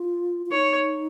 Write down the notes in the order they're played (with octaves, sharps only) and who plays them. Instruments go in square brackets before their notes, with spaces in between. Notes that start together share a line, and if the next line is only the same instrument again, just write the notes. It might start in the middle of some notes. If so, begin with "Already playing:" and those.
Already playing: [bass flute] F4
F4
[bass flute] D#4 [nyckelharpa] C#5